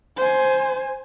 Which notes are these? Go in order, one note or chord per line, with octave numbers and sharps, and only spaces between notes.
C5 G#5